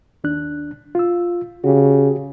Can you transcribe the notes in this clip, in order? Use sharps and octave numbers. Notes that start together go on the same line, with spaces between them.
D#2 D4 F#6
F4 E6
C#3 F#4 G4